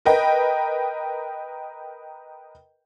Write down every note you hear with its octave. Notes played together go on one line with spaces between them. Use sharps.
A#4 B4 D#5 G5